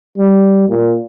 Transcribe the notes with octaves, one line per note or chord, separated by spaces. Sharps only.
G3
A#2